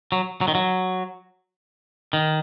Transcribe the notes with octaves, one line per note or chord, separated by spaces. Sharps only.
F#3
F#3
D#3
F#3
D#3